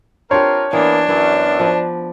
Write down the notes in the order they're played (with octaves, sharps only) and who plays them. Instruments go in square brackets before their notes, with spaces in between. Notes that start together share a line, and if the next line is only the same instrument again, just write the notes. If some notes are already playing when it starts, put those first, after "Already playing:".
[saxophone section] C4 F4 A#4 [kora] D4 G4 [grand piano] C#5
[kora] E3 [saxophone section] A#3 B3 [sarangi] D4
[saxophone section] F#2 [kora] E3 B3
[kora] F3 B4